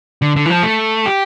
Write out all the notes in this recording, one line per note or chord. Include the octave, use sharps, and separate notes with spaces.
D3
D3
E3
F3
A3
G4